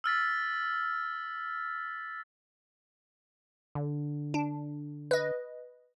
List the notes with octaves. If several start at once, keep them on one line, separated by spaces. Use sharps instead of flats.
E6 F6 A6 B6
D3
D4
B4 D#5